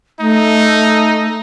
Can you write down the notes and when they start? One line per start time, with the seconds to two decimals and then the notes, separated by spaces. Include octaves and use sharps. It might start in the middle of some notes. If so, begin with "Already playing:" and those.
0.20 A3 D#4